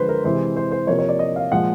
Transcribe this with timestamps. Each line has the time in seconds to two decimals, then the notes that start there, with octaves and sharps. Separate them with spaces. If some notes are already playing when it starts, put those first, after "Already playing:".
Already playing: D3 F3 G#3 B4 C5
0.09 A#4
0.24 C3 E3 G#3 C5
0.56 C5
0.71 C5
0.87 C3 F3 A#3 C#5
0.99 C#5
1.09 D5
1.19 D#5
1.36 F5
1.52 A#2 F3 G#3 F#5